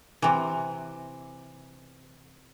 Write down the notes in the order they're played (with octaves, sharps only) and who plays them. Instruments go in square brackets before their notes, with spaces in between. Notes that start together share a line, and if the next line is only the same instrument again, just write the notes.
[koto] C3 E3